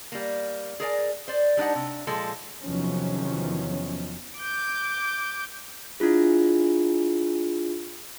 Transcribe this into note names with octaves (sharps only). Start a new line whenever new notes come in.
G3 A#3
G#4 A#4 D5 G#5
C5 D5
G3 D4 D#4 F#5
C3
A#2 F3 G#3 A4
E2 C3 D#3 F3 F#3 C#4
D6 G6
D4 E4 F4 G#4